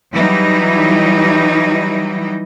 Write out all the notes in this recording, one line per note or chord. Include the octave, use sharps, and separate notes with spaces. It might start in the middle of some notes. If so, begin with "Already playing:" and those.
E3 F#3 G3 D#4